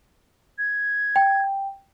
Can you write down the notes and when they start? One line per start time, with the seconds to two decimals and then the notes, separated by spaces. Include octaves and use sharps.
0.58 G#6
1.16 G5